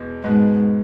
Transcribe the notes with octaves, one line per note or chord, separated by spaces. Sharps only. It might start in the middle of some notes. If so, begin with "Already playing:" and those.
Already playing: E2 B2 G#3 B3
G#2 B2 G#3 B3